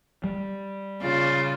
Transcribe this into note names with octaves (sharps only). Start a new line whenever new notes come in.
G3
C#3 F4 D5